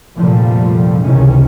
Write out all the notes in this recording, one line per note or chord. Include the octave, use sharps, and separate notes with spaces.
F1 A#2 D3 F3 G3 A3
G1 C#2 C3 D#3 E3 C#4